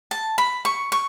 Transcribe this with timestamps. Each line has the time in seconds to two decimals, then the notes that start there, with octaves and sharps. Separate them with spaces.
0.11 A5
0.38 B5
0.65 C#6
0.92 C#6